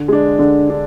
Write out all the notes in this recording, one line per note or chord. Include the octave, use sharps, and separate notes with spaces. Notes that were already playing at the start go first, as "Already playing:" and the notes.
Already playing: D3
G#3 D4
D3
D4